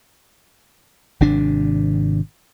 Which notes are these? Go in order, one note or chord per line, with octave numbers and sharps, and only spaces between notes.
G#1 C3 D4